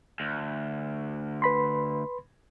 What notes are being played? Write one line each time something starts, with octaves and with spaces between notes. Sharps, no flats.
D2
B4 B5 C6